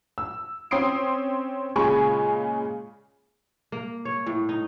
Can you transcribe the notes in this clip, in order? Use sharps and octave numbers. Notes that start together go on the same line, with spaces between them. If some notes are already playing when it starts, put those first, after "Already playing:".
E6
C4 C#4 C6 D#6 C7 D7
A#2 C#3 G#3 G#5 B5 C#6
A#3
C#5
A2
D#4